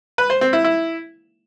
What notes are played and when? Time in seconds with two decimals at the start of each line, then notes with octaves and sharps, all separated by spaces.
0.18 B4
0.30 C5
0.41 C4
0.53 E4
0.64 E4